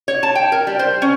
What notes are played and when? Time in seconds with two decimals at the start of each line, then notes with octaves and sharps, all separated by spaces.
0.08 C#5
0.23 A5
0.35 G5
0.52 A#4
0.67 G3
0.79 C5
1.02 C#4